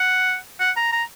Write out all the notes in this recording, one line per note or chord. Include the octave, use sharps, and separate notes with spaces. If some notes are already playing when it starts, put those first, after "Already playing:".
Already playing: F#5
F#5
A#5
A#5